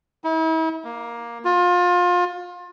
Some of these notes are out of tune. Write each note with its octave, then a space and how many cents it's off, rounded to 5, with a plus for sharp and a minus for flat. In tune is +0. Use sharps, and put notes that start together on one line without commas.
E4 -40
A#3 +10
F4 +30